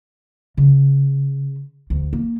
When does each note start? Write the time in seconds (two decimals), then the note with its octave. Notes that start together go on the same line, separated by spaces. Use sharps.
0.57 C#3
1.90 D2
2.13 A#3